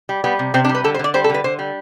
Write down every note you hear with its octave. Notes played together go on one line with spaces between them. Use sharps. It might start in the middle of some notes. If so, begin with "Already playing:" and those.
G3
G3 B3
C3
C3 C4
D4
G3
B4
D3 A4
C5
D3 D5
G3 C5
A4
D3 B4
D3 C5
G3